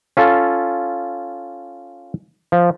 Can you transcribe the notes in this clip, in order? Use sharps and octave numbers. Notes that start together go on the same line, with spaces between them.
C#4 F4 A4
F3